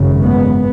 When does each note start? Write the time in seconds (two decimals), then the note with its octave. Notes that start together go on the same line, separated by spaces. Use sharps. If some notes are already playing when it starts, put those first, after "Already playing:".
Already playing: G#1 F#2 C#3
0.24 B3